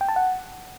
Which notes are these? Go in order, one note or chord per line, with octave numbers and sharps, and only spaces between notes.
G5
A5
F#5